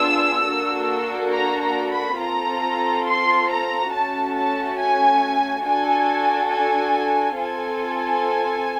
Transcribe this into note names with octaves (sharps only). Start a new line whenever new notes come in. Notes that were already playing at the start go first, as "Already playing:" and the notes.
Already playing: B3 D4 F4 G#4 E6
A#3 D4 F#4 A4
A#5
A#5
B5
C4 F4 A4 A#5
C6
A#5
A3 C#4 F#4 A5
A5
G#5
D4 F#4 A4 G#5
G#5
C4 F4 A4 G#5